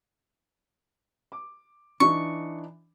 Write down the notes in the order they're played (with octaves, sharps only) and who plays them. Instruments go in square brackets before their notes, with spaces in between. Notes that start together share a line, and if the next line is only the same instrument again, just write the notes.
[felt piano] D6
[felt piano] E3 D4 D#4 [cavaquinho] C#6